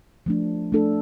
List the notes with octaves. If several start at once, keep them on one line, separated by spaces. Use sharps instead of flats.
F3 A3 D4
A3 D4 A4